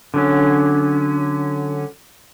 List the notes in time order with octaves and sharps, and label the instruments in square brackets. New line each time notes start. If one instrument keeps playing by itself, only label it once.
[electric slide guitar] D3 F#3 C#4